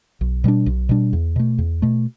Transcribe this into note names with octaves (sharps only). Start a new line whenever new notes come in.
B1
B2 G3 D4
B1
B2 G3 D4
E2
B2 A3
E2
B2 A3